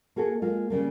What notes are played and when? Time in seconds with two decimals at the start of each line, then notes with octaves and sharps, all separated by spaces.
0.16 A#3 F#4 G#4 A4
0.42 G#3 A#3 F4
0.70 C#3 G3 A#3